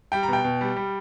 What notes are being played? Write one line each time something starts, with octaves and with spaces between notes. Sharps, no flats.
G3 G5
A#5
B2 G5
B2
G3
G3